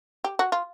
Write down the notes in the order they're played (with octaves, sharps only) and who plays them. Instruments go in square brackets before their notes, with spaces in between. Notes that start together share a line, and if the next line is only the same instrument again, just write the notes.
[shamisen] G4
F#4
F4